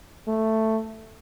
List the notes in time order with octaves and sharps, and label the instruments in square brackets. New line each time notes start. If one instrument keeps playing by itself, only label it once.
[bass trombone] A3